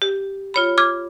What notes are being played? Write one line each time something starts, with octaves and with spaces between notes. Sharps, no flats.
G4
F4 C#5 B5
D6 F6 G#6